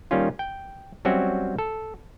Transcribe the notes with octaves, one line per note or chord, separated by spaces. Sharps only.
D#3 G3 A#3 C#4 F4
G5
F#3 G3 C4 C#4 F#4 E5
A4